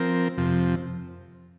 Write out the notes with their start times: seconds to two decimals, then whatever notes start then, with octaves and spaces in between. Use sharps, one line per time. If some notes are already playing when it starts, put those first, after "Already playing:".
Already playing: F3 C4 A#4
0.38 F2 C3 F3